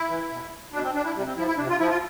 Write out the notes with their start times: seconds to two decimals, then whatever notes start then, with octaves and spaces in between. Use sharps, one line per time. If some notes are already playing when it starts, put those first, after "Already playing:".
Already playing: E4
0.09 E3
0.30 B2
0.73 B2 D4
0.83 C4
0.95 D4
1.04 E4
1.15 C3 G3
1.26 C4
1.36 F3 E4
1.48 E4
1.58 C3 D4
1.69 F4
1.80 F3 E4
1.90 F4